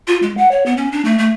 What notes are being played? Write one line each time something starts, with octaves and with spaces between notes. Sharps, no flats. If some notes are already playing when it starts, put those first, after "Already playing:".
F4
G#3
F#5
C#5
B3
C#4
D4
A3
A3